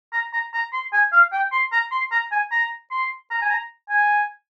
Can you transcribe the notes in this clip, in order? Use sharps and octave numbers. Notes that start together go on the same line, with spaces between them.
A#5
A#5
A#5
C6
G#5
F5
G5
C6
A#5
C6
A#5
G#5
A#5
C6
A#5
G#5
A#5
G#5